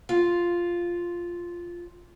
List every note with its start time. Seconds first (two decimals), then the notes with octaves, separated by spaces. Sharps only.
0.09 F4 F5